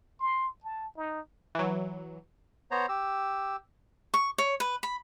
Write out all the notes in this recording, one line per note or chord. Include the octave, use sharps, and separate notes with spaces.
C6
A5
D#4
E3 F#3
B3 C5 C#5 A#5
G4 E6
C#6
C#5
B4
B5